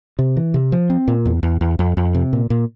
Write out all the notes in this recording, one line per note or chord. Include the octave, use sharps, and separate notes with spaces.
C3
E3
C3
F3
C4
A#2
E2
E2
E2
F2
F2
C3
A#2
A#2